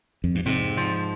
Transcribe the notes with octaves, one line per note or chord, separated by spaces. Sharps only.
F2
G2
G#2 C3
F3